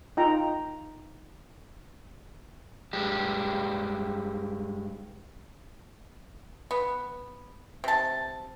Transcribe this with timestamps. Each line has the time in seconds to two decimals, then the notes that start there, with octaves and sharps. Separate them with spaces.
0.17 D#4 F4 G5 A#5
2.93 G2 G#3 G4
6.71 B3
7.84 C3 A5